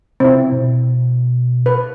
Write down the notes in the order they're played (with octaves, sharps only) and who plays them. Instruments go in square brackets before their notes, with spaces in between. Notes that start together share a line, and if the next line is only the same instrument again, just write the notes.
[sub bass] C3 [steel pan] C4 E4
[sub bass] B2
[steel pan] B4